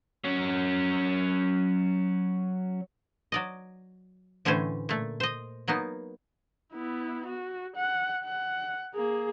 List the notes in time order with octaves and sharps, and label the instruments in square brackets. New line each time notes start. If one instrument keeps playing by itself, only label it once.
[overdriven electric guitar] F#3 C#4
[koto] F#3 D5 D#5
A2 D3 E3 A3 C#4 C5
A#2 A3
C5 D#5
F#3 A#3 B3 D#4
[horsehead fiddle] B3 E4
F#4
F#5
F#5
A#3 G#4